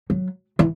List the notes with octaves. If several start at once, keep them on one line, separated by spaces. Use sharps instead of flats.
F#3
E3